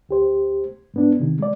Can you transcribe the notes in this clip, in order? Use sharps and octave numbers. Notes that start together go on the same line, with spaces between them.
D2 G4 C5
G#2 B3 D4
C3 D#3
G#3 D5